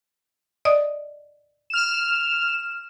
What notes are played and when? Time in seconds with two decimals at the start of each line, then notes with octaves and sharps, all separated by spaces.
0.65 D5 D#5 D#6
1.70 F6 E7